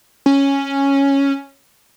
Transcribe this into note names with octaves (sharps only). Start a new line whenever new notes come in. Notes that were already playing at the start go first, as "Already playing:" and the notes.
C#4